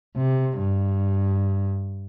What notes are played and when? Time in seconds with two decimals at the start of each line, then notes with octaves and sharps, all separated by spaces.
0.17 C3
0.58 G2